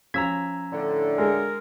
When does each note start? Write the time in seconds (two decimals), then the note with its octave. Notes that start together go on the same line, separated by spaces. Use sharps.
0.14 F3 C#4 A#5 E6 G#6 B6
0.72 A2 D3
1.18 G#3 G#4 A#4